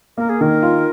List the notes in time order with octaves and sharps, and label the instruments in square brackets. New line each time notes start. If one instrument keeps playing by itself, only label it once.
[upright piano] A#3 [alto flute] A#4
[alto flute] G#4
[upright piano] D#3 [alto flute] A#4
[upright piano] F4